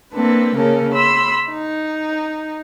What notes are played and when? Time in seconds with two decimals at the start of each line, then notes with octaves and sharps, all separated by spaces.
0.14 A#3 C4 D4 A4 B4
0.57 C#3 A#3 C#4 A4 A#4
0.92 B5 C6 E6
1.51 D#4